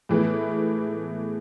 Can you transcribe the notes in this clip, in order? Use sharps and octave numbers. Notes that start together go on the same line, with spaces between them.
A2 E3 G#3 B3 E4